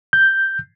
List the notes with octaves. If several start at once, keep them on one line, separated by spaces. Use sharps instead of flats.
G6